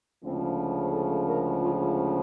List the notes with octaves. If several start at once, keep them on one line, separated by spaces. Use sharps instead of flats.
D2 C#3 F3 G#3 C4
A4
A#4
F4